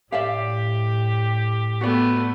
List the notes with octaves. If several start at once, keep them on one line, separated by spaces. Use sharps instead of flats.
A2 G4 D5 E5 F5
A3 B3 F#4 D5